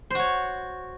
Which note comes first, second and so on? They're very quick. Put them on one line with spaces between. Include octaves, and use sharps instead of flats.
C5 F#4 C#5